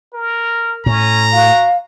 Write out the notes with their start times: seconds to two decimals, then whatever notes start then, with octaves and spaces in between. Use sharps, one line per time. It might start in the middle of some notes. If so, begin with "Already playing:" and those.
0.14 A#4
0.86 A2 C#4 A#5
1.33 F#4 F5